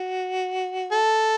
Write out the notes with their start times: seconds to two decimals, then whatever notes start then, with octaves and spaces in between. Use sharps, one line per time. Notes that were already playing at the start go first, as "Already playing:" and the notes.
Already playing: F#4
0.92 A4